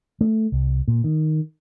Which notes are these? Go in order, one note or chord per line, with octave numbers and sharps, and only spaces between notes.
A3
C2
A#2
D#3